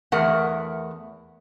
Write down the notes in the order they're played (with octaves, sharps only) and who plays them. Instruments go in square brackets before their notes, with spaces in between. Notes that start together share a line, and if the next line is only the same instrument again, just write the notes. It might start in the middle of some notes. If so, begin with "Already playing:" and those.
[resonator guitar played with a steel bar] E2 A3 G#4 A#4 E5 F#5